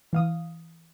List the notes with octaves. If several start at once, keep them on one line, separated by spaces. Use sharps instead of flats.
E3 F5 D#6